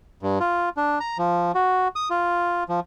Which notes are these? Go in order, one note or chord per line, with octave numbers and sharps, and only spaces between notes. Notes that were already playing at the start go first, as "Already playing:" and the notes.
G2
F4
D4
A#5
F3
F#4
D#6
F4
F3